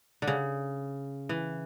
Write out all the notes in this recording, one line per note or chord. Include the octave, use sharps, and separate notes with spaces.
D3
C#3
E3